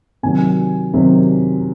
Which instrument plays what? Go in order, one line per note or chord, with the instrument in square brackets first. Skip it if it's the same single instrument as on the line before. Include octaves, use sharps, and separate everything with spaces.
[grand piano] C3 D#3 F#3 G#5
C3 D#3 F#3